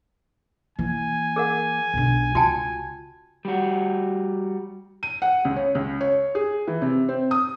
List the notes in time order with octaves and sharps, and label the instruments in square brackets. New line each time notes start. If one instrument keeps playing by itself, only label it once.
[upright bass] E3 A#3 [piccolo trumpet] G#5
[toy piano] G#4 A#4 F#5
[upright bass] B1 D3
[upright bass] C#2 F4 [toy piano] F#4 G5 A5
[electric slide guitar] G3 F#4
[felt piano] D#7
F#5
C#2
C#5
C#2
C#5
G#4
E3
C3
C4
D#6